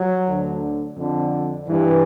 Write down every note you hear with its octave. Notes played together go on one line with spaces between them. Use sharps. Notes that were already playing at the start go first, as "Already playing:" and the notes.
Already playing: F#3
D2 D3
F2 D3
G2 E3